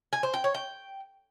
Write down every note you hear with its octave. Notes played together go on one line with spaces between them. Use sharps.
G#5
C5
G5
C#5
G5